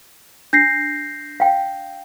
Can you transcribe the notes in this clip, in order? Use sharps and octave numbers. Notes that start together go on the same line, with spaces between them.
D4 G6 A#6 C7
F5 G5